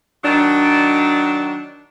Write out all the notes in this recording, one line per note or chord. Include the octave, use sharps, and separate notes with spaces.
D#3 F#3 D4